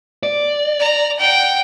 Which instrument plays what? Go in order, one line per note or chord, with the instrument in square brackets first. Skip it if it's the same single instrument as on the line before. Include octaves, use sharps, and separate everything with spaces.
[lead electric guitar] D5
[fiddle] A#5
F#5 G5